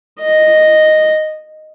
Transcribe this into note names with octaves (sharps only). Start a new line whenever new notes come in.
D#5